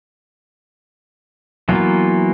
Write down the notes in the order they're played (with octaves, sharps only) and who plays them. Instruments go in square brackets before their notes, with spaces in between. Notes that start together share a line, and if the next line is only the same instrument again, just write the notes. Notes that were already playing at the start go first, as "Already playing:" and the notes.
[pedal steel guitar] E3 F#3 A#3 B3 F4